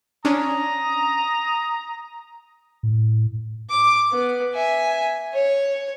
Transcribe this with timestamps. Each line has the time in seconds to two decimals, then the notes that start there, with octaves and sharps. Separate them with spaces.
0.25 C#4 D4 A#5 D#6
2.83 A2
3.71 D6
4.12 B3
4.55 E5 G#5
5.34 C#5